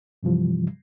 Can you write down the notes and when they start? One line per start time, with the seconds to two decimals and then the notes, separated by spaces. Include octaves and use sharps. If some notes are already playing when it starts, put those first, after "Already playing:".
0.23 G2 C3 E3 F3 G3